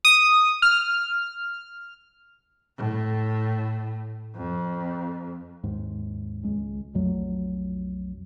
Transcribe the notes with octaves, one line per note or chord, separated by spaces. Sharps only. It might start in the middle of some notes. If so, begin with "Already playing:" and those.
D#6
F6
A2
F2
D#2 G#2
C#2 G#3
B1 F2 F#3 A3